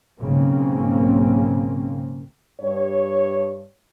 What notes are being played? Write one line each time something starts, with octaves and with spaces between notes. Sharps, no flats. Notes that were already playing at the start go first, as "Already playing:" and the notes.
B1 G#2 C#3 A#3 C4 C#4
G2 C#5